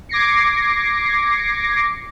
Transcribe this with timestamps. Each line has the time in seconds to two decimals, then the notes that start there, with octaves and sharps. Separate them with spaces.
0.09 D6 G#6 A#6 C7 C#7